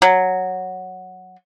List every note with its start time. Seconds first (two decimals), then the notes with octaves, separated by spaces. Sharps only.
0.02 F#3